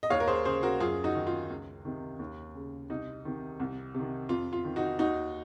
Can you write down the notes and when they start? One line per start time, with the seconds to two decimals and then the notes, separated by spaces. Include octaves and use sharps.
0.03 D#5
0.10 D#2 C#5 F5
0.20 A#4
0.27 G#4 C5
0.45 C#3 G#4 C5
0.63 F#4 A#4
0.80 F#2 F4 G#4
1.04 D#4 F#4
1.15 D#3
1.27 F4
1.50 C#2
1.85 C3 D#3
2.19 D#2
2.55 C#3
2.90 C2 D#4
3.25 C3 D#3
3.60 C2
3.94 C3
3.99 D#3
4.29 F2 F4
4.53 F4
4.64 D#3
4.76 D#4 F#4
4.99 D#2 D#4 F#4